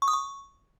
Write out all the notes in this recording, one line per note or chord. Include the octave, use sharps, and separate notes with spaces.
C#6
D#6
C#6